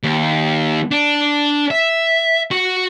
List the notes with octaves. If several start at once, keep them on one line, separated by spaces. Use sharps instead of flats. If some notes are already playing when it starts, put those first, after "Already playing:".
D#2
D4
E5
F#4